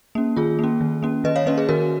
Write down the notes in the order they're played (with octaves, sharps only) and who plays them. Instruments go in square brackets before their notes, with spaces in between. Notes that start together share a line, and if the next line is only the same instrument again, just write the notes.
[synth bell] A#3 C#4
D#3 F4 G#4
A#3 C#4
D#3
A#3 C#4
D#3 B4 D#5
C#5 F5
A#3 C#4 B4 D#5
G#4 B4
D#3 F#4 A#4